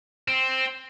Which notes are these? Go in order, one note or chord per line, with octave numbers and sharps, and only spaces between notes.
C4